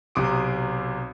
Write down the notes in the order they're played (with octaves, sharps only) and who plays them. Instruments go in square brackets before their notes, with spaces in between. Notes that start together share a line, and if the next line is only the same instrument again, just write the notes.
[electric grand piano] B1 C3 C6 D6 D#6 D7